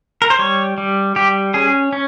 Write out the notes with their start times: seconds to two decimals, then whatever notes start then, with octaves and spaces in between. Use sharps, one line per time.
0.22 A#4
0.30 C5
0.39 G3 C#5
0.78 G3
1.16 G3 G4
1.54 C#4 G#4
1.93 C#4